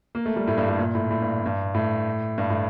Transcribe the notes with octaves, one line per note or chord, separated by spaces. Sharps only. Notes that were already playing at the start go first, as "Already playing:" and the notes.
A#3
A3
G3
A2
G2
A2
A#2
A2
A2
G2
G2
A2
G2
A2